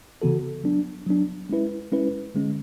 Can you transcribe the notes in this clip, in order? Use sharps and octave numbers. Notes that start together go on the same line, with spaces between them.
C#3 E3 B3 F#4 A4
F#3 B3 D4
F#3 B3 D4
G#3 C#4 E4 B4
G#3 C#4 E4 B4
D3 G#3 C#4